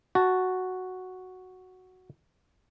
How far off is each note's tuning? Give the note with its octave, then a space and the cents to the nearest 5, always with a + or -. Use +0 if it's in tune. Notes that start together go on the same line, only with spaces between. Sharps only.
F#4 +0 A5 +0